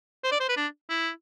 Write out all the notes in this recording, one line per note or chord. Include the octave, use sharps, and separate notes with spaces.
C5
D5
C5
B4
D4
E4